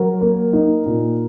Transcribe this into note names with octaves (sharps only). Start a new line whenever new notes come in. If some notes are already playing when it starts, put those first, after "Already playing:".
Already playing: F#3 A#4
A#3
D#4
A#2